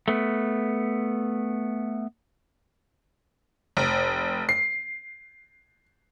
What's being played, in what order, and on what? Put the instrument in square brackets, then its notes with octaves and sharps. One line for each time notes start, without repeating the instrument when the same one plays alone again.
[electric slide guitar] A3 B3
[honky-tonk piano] F1
C7